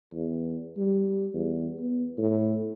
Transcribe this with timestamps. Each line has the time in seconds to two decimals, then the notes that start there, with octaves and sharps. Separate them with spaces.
0.13 E2
0.77 G3
1.34 E2
1.79 B3
2.18 A2